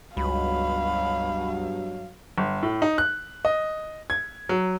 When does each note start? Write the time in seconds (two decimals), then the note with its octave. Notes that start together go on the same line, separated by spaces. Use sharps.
0.17 C#2 G2 B2 F#3 F5 B5
2.38 G1
2.63 A2
2.82 D#4
2.98 F#6
3.45 D#5
4.10 G#6
4.49 F#3